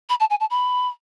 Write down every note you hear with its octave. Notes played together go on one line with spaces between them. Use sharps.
B5
A5
G#5
A5
B5